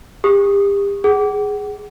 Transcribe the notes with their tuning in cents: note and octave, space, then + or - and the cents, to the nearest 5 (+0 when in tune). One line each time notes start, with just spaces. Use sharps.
G4 +35 D#6 +0
G#4 -5 F#5 +35